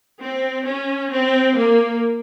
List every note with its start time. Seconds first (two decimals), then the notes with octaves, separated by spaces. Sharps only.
0.20 C4
0.65 C#4
1.10 C4
1.56 A#3